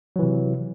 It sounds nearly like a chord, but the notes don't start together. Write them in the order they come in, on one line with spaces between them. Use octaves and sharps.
F#3 E3 C3